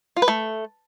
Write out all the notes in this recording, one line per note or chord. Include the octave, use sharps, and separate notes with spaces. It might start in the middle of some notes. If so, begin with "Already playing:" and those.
F4
B4
A3